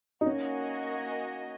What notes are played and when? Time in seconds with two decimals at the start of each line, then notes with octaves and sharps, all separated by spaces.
0.21 D#4
0.26 A#3 C#4 F#4 D#5 G#5